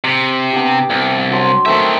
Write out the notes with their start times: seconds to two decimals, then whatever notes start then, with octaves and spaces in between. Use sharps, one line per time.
0.04 C3
0.53 B3 D4 G4
0.90 C2
1.31 F#3 D4 C6
1.66 D#3 A3 C4 E5